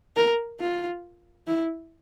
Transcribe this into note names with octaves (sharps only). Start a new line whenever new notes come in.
A#4
F4
E4